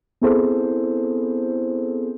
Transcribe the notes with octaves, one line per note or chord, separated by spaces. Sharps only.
B3 C4 E4 G#4 A4 C5